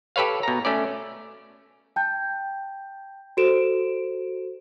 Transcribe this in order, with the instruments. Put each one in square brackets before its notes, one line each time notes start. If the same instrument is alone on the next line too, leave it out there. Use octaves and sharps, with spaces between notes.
[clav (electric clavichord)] G4 A4 B4 C#5 F5
B2 A#5
A3 C#4 D5
[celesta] G5 A5 G6
F#4 A4 C5 D7 E7